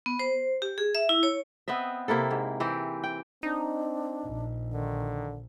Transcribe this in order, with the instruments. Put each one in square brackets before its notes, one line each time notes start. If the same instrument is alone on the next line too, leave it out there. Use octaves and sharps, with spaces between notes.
[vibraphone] B3
C5
G4
G#4
E5
E4
C#5
[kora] B3 C4 D#5 E5
C3 A#3 E4 A4
G#2
E3 C4 G4
G5
[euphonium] C4 [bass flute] D4 [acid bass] D#4
[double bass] A#1
[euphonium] D3 [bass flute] D#3